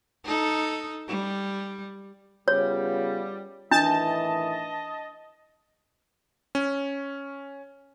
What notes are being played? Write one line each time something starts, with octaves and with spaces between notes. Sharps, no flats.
D#4 A4
G3
C#3 G3 B3 F4 C#5
A2 D#3 E3 D4 D#5 A5
C#4